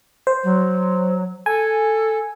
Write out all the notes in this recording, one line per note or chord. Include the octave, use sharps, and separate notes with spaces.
C5
F#3
A4 G#5